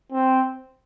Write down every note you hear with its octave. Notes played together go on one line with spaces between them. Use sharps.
C4